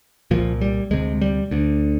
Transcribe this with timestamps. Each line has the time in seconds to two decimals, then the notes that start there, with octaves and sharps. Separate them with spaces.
0.31 C2 A#2 F3
0.61 G3
0.91 D2 C3 G#3
1.21 G3
1.51 D2 D3